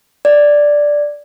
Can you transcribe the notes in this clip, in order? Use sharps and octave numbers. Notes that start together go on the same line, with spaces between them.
D5